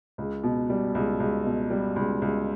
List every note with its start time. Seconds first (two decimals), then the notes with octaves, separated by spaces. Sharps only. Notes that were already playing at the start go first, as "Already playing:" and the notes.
0.18 C#2
0.43 B2
0.70 G3
0.95 C#2
1.20 C#2
1.45 B2
1.70 G3
1.96 C#2
2.22 C#2